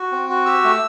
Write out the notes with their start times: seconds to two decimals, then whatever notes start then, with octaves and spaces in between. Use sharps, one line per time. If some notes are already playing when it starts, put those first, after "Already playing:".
Already playing: F#4
0.12 C4
0.29 F#4
0.46 G4 E6
0.64 A3